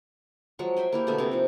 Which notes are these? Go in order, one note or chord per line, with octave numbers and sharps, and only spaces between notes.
F3 F#3 G#3 C#6
C5 E5 G5 G#5
A#3 E4 G4
B2 D3 A3 E5
C3 G#3 A#3 C4
F3 D#4